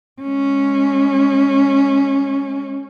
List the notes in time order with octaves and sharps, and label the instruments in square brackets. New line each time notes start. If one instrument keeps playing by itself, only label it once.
[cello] G#3 C#4